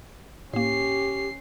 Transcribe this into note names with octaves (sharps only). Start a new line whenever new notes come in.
A2 A#3 C#4 G4 C7